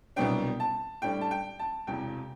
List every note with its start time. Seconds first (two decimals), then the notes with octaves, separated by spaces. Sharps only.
0.16 C2 B2 F#3 B3 D4 G5
0.60 A5
1.02 A2 G3 D4 G5
1.21 A5
1.31 G5
1.59 A5
1.87 E1 E2 C3 G5